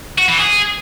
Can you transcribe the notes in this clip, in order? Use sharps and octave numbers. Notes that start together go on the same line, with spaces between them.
F#4
E3
G#4